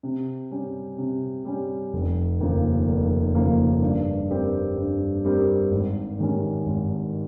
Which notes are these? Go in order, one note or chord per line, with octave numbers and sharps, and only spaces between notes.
C3
G3 C#4
C3
G3 C#4
F1
D#2 C#3 F3 A#3
F1
D#2 C#3 F3 A#3
G2
G3 C4 G4 A#4
G2
G3 C4 G4 A#4
G#1
G#2 D#3 G3 C#4
G#1